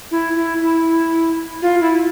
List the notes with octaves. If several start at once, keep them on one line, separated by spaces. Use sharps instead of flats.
E4
E4
E4
F4
E4